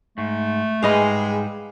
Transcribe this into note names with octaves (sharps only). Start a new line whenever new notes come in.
G#2 A3
G#2 G3 G#3 B4 D#5 F5